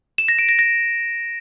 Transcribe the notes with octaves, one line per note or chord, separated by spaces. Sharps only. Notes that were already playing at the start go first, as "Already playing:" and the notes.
E7
A#6
D7
A#6
A#6